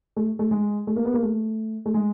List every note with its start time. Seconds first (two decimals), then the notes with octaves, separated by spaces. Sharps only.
0.16 A3
0.39 A3
0.51 G#3
0.87 A3
0.96 A#3
1.05 B3
1.14 A#3
1.23 A3
1.86 A3
1.94 G#3